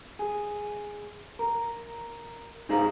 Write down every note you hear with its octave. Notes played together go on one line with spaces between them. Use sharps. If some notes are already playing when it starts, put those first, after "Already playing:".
G#4
A#4
G#2 D#4 G#4 C5 F5 A#5